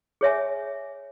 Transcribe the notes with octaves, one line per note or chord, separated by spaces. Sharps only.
G#4 C#5 E5 G#5